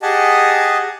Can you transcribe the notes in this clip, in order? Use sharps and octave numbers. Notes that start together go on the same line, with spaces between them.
G4 G#4 D#5 F#5 G#5 A5